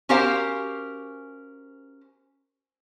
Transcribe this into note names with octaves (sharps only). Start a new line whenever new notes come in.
C#4 F#4 G4 A#4 C5 F5